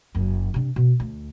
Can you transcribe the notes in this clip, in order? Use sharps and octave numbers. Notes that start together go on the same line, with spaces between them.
F#1 F#2
C3 D4
B2
D2